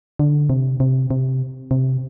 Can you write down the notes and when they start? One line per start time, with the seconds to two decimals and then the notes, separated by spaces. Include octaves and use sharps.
0.19 D3
0.50 C3
0.80 C3
1.11 C3
1.71 C3